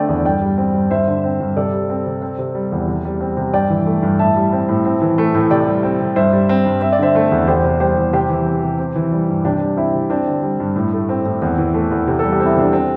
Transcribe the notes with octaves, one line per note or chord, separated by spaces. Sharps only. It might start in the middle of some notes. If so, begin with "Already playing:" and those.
Already playing: D3 A3 C4 D5 G5
E2
G2 D5 G5
G3
C4
G2
G2 C5 E5
D3
C4
G2
C3 A4 D5
G3
C4
C3
C4
C3
G3
E2
C3
G3
C4
C3
G2 D5 G5
E3
A3
G2
A2 E5 A5
G3
C4
A2
C4
E3
A3
A2
C3 D5 G5
G3
C4
C3
G2 C5 E5
G3
C4
G2
C4 E5
D5
D3 C5 E5
A3
E2
E2 G4 C5
C3
G3 G4 C5
E2
C3 G4 C5
E3
C4
C3
C4
E3
G3
G2
C3 D4 G4
G3
C4 E4
C3
C4 D4
D3
G3
G2
A2
A3
C4
A2
E2 C4
E3
A3
E2
C3
G3 A4
G4
C4
E4
C3 D4
C4